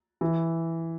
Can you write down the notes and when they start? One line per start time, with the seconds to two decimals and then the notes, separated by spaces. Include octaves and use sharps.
0.21 E3